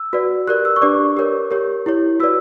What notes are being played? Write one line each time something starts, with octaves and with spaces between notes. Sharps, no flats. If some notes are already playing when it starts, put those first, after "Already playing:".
Already playing: E6
F#4 B4 D5
G4 A#4 D5 F#6
E6
C#6
D4 G4 B4 D5 D6
G4 A#4 C#5
G4 A#4 C#5
E4 G4 C#5
F#4 B4 D5 E6